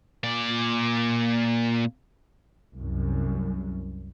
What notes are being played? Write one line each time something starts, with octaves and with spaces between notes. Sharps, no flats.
A#2 D5
C2 F#2